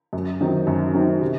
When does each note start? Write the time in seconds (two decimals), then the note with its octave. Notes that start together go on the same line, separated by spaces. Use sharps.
0.13 F#2
0.41 D#3 F#3 C4 D#4
0.67 F#2
0.94 D#3 F#3 C4 D#4
1.21 C3